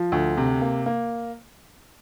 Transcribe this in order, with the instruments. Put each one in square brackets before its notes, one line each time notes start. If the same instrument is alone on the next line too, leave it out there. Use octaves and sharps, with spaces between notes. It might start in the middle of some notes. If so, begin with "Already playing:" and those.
Already playing: [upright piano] F3
D2
C3
A#3
A#3